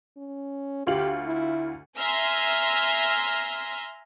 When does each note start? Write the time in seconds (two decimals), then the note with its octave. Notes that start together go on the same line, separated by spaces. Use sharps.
0.18 C#4
0.87 D2 F4 G4 F#7
1.26 E4
1.98 E5 G#5 A#5 C6 E6 F6